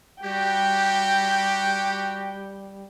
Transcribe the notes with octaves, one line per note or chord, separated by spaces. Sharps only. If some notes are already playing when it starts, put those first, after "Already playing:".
G3 F#4 G4 G5